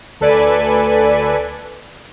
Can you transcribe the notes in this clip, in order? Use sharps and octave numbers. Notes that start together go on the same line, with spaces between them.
D2 A4 B4 D5 G#5 B6